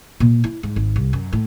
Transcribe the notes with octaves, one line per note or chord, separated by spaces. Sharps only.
A#2
E4
G#2
G#1
C2
F#2
A2